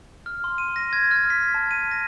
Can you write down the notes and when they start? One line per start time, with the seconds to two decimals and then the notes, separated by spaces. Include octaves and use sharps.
0.26 F6
0.44 C6
0.58 D#7
0.76 A#6
0.93 G#6
1.11 F6
1.30 B6
1.54 A5
1.71 D#7
1.91 A#6